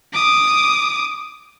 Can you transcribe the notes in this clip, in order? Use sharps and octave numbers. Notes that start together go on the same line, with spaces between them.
D6 D#6